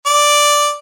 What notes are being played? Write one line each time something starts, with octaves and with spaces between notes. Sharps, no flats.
D5